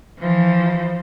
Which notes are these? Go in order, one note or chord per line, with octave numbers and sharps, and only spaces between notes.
E3 F3